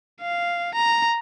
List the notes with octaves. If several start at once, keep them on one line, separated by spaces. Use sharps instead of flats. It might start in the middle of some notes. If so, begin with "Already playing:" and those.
F5
A#5